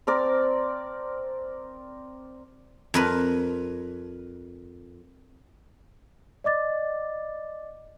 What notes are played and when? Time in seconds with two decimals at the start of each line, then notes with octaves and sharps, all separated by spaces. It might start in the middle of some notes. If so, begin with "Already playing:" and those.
0.07 C4 A#4 D5
2.94 F2 A#4 B4
6.44 D5 D#5 D6 A6